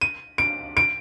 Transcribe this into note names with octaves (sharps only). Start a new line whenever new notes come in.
D#7
D7
D7